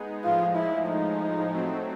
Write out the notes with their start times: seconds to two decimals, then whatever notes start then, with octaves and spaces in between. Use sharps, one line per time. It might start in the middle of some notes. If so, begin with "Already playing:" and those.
Already playing: G#3 B3 D#4 G#4
0.24 A2 F3 G#3 F4
0.56 E4
0.88 D#4
1.52 F#3 A3 C4